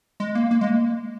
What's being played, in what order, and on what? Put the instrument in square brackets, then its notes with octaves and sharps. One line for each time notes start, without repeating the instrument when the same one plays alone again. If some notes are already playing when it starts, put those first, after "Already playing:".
[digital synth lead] G#3
A#3
A#3
G#3